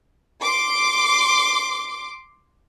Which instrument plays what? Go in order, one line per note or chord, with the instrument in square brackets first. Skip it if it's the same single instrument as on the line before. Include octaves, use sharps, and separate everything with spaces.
[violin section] C6 D6